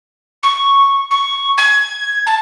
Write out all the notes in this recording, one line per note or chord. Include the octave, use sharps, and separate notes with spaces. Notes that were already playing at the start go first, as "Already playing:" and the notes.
C#6
C#6
G#6
A5